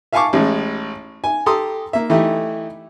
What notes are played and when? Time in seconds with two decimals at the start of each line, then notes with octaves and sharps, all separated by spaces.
0.13 E5 F5 G#5 A5 C#6 D6
0.33 A1 A2 G#3
1.24 G#5
1.46 G4 A4 A#5 C6 D#6
1.93 A#3 E5
2.10 E3 A3 D#4 E4 G4